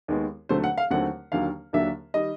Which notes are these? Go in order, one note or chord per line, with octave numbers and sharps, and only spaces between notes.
D#2 D#3 G#3 B3
D#2 D3 F#3 A3 C4 C5
F#5
F5
D#2 D3 F#3 A3 C4 F#5
D#2 D3 F#3 A#3 D4 F5
D#2 D3 F#3 A#3 D4 E5
D#3 G3 D#5